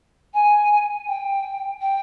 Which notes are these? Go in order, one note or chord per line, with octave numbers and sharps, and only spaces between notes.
G#5
G5
G5